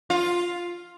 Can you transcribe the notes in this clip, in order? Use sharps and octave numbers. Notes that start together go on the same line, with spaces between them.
F4